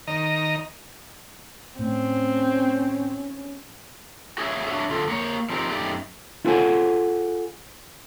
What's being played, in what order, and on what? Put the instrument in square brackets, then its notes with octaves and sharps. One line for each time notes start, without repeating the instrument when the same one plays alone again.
[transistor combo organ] D#3 D#5 A#5
[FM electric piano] A2 [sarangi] C4 [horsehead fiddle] C#4
[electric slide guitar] F#4 G#4 C#5 E5
F#3 D4 F#4 C#5 E5
D3 F4 A4
A#3 C#5
F3 C4 D#4 G4 A#4
F#2 A3 D#4 G4 D5
[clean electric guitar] E4 F4 G#4 A4 F#5 G#5